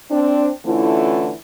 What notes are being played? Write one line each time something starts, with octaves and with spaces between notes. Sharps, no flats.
C4 D4
D3 E3 A3 C#4 E4 F4